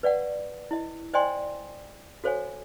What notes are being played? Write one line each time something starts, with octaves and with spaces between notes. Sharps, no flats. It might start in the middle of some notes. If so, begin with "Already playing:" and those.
B4 D5 F5 F#5
E4 D#5
C5 D5 D#5 G5 G#5 C6
F#4 A4 C5 C#5 F5 G#5